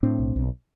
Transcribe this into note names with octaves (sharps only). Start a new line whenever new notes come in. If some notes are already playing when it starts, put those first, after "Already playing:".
A2 C4 D4
B1
B1